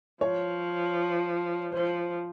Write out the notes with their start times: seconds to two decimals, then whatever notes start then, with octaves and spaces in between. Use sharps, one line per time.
0.21 F3 C#5
1.72 F3 C5